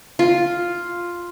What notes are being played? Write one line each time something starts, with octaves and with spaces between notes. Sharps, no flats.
F4